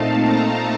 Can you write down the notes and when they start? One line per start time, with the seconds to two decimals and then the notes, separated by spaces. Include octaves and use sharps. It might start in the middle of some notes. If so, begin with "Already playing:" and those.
Already playing: A#2 A3 C4 D#4 F5 A5
0.23 A#5